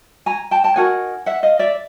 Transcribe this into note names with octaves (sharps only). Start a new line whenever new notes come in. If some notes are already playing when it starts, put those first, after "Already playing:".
G#5 A#5
G5 A5
G5 A5
D#4 F#4 A#4 F#5 G#5
E5 F#5
D#5 F5
D5 E5